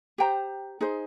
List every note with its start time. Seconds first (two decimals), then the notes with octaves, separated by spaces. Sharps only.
0.18 G4 C5 G5 A#5
0.81 D#4 G#4 C5